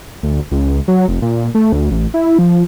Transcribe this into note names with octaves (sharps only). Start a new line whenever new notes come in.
D2
C#2
F#3
F1
A#2
A3
D2
A1
E4
F3